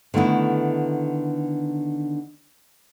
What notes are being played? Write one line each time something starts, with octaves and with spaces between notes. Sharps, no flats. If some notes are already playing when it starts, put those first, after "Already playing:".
D3 D#3 A3 B3 E4